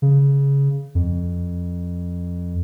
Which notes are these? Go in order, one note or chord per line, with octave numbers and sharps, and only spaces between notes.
C#3
F2